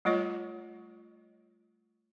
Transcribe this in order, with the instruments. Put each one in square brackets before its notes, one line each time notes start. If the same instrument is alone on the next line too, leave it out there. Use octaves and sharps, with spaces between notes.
[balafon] G3 A3 F4 C#5 D#5